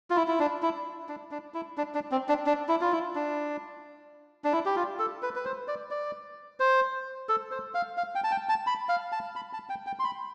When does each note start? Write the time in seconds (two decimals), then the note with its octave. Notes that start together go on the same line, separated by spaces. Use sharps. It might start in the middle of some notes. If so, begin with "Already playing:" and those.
0.10 F4
0.16 E4
0.28 E4
0.40 D4
0.62 E4
1.09 D4
1.31 D4
1.54 E4
1.78 D4
1.94 D4
2.11 C4
2.29 D4
2.46 D4
2.69 E4
2.81 F4
2.92 E4
3.15 D4
4.44 D4
4.52 E4
4.66 G4
4.76 F4
4.99 A4
5.22 B4
5.36 B4
5.45 C5
5.68 D5
5.91 D5
6.60 C5
7.29 A4
7.51 C5
7.75 F5
7.97 F5
8.15 G5
8.24 A5
8.31 G5
8.49 A5
8.67 B5
8.89 F5
9.12 A5
9.36 B5
9.53 A5
9.70 G5
9.87 G5
9.99 C6
10.04 B5